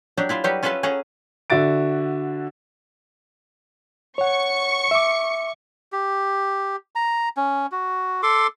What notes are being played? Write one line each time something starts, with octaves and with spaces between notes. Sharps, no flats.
F#3 D4 G4
E4 F4 E5
F#3 G3 F#4 G4 B4
C#4 F4 A4 B4 E5 A5
C#4 G#4 A4 F#5 A5 A#5
D3 F#4 E5 A6 D7
C#5 F#5 C#6 C#7
E5 D6
G4
A#5
C#4
F#4
A4 C6 D6